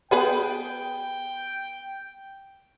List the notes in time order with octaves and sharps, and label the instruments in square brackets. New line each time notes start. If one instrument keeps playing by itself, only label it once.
[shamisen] B3 G#4 B4 [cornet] G5